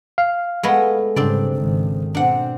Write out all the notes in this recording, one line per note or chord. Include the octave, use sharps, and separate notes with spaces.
F5
G#3 A3 B3
G#2 C#3 G3 C4 D4 D5
G#1 D#3
B2 C4 D4 F#5